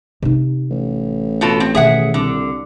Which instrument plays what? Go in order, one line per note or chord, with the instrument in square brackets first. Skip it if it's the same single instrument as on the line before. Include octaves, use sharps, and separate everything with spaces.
[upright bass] C3 D#4
[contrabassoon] A1
[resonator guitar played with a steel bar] B2 F4 A4
C4
[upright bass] B2 D#3 [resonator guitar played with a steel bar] G#4 E5 F#5
[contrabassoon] C2 [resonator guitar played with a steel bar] D3